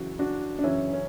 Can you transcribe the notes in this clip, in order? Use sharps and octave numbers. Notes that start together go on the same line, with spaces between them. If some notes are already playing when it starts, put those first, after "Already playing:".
Already playing: F#2 C#3 E3 F#4
D4 F#4
D4
F#2 C#3 E3 C#4 E4
C#4